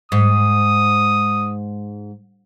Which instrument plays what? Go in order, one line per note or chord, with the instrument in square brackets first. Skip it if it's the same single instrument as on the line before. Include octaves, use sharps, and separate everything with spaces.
[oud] G#2 [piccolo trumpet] D#6